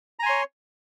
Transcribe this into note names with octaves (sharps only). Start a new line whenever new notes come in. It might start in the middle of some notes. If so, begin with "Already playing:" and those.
C#5 G#5 A#5 C6